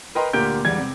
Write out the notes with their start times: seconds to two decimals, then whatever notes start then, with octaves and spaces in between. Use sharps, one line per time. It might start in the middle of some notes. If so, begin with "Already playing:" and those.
0.15 A#4 B4 D#5 G5 A#5 C6
0.33 D2 A#2 G4 A#4 G6 D7
0.65 E1 E2 G3 G#6
0.78 C3